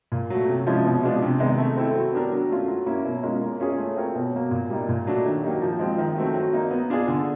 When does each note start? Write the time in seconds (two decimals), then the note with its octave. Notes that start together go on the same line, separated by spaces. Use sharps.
0.12 A#2
0.30 F#3 A3
0.49 C3
0.67 F3 G#3 C#4 E4
0.85 B2
1.03 G#3 B3 D4 F4
1.22 C3
1.40 D#3 G#3 B3 D#4
1.58 A3
1.76 C4 E4 A4
1.95 F#3
2.13 B3 D4 G4 A#4
2.32 F#3
2.50 A3 C#4 F4
2.68 F#3
2.86 A#3 C#4 E4
3.05 B2
3.23 G#3 C#4 F4 A#4
3.41 A#3
3.60 C#4 F4 G#4 C#5
3.79 A3
3.97 C4 F4 A#4 C#5
4.15 B2
4.33 F#3 A#3
4.51 A#2
4.70 G3 A#3 D#4
4.89 A#2
5.07 F#3 A3 D4
5.25 D#3
5.43 F#3 A#3 D#4 G4
5.61 F3
5.79 G#3 C4 F4
5.98 D#3
6.16 F#3 A3 C4
6.34 F#3
6.53 A#3 D#4
6.71 B3
6.90 D4 F4 G#4
7.08 D3